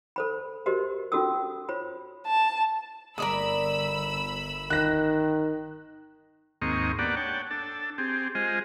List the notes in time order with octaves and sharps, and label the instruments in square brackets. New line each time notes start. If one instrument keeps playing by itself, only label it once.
[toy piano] A4 C5 B5
F#4 G4 A#4 C5 D#5
C#4 F4 F#4 A4 D#6 E6
F4 C5 C#5 B5
[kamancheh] A5
[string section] G1 B5 E6 [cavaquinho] A#4 D5 D#6
[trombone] D#3 [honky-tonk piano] F#6 A#6
[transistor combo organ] D#2 G#2 A#3 C4 D#5 C#6
A#3 B3 D4 G4 D5 F#5
C#5 F#5 G5 A5
D4 A4 A5
C4 G4 G#4
G#3 F4 G#4 C5 D#5